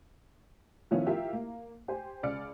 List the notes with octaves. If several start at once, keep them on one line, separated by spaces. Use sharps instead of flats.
D#3 F3 B3 C#4 E4 F4
E4 F4 G4 A#4 E5 F5
A#3
G4 C5 G#5
C#2 D5 F6 C#7